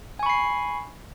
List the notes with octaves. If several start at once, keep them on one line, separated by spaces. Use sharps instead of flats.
G#5 B5 C#6 C7